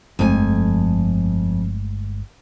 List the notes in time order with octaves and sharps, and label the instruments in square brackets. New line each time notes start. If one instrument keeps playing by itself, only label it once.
[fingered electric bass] G1 G#3 A3 [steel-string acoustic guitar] F2 A4 G#5